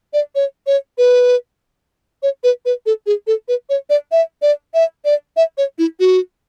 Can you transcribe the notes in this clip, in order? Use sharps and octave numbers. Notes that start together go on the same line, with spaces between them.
D5
C#5
C#5
B4
C#5
B4
B4
A4
G#4
A4
B4
C#5
D5
E5
D5
E5
D5
E5
C#5
E4
F#4